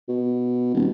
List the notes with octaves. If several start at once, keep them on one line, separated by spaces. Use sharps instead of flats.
B2
D#1